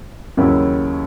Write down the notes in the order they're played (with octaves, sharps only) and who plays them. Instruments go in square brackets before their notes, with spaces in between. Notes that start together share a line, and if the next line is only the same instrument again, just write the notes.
[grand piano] D#2 C#3 F#3 C#4 E4